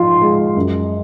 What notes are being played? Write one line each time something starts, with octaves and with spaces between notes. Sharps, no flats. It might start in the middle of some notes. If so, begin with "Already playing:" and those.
Already playing: G#2 F3 F4 F5 C6
G#3
F#2